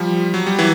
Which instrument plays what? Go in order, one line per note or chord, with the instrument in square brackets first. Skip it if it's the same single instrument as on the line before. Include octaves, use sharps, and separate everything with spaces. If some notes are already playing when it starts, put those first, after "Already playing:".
Already playing: [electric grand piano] F3 G3
F#3
G3
E3 F#3